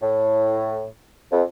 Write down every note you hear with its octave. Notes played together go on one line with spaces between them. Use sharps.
A2
F2